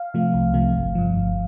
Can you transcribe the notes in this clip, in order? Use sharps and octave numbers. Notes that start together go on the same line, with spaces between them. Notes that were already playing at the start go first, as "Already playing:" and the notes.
Already playing: F5
C3 F3 A3
C2
C3 F3 A3
G1
G2 F3
G1